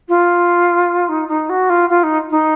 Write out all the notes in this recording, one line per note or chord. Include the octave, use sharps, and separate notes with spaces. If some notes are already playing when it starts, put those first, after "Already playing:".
F4
D#4
D#4
F#4
F4
F4
D#4
D#4